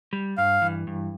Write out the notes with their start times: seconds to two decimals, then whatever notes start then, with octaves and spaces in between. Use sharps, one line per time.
0.13 G3
0.37 G2 F5
0.62 E3
0.87 G2